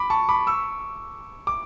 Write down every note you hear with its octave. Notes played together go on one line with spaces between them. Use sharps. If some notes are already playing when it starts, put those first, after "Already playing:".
Already playing: B5 D6
A5 C#6
B5 D6
C#6 E6
D6